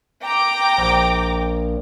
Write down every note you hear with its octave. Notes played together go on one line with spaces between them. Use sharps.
G5 A#5 D6
A#1